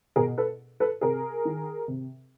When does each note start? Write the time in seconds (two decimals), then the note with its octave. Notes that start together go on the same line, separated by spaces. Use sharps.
0.16 B2 G#4 A#4
0.38 A4 B4
0.80 A4 B4
1.01 C3 G#4 A#4
1.45 D#3
1.88 C3